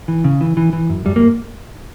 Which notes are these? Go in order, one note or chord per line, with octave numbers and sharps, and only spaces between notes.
E3
C#3
E3
E3
E3
F#2
F#2 G3
A#3